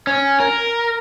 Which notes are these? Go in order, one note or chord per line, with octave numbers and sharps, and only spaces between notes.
C#4
A#4